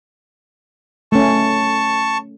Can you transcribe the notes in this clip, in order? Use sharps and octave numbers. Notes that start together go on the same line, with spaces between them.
A3 C#4 A5 C#6